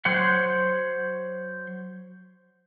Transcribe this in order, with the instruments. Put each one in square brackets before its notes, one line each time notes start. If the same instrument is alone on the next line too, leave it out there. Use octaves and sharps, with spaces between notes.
[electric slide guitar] F#3 C5 C#5 F#5